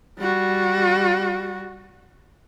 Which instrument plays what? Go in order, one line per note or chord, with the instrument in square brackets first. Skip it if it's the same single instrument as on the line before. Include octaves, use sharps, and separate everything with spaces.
[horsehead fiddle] G3 F#4